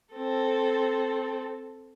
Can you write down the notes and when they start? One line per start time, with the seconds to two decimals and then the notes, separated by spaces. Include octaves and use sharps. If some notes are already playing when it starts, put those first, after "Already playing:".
0.14 C4 A4